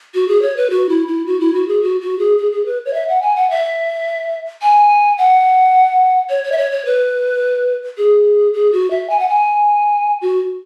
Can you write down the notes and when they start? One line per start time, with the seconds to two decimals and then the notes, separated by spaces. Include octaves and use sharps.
0.14 F#4
0.28 G#4
0.42 C#5
0.57 B4
0.70 F#4
0.89 E4
1.08 E4
1.26 F#4
1.40 E4
1.54 F#4
1.68 G#4
1.82 F#4
2.01 F#4
2.19 G#4
2.38 G#4
2.52 G#4
2.66 B4
2.85 C#5
2.94 E5
3.08 F#5
3.22 G#5
3.36 F#5
3.50 E5
4.62 G#5
5.18 F#5
6.30 C#5
6.44 C#5
6.52 E5
6.58 C#5
6.72 C#5
6.85 B4
7.98 G#4
8.54 G#4
8.72 F#4
8.91 E5
9.10 G#5
9.19 F#5
9.29 G#5
10.22 F#4